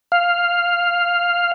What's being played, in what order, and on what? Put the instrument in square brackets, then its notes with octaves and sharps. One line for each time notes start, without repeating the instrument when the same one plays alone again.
[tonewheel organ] F5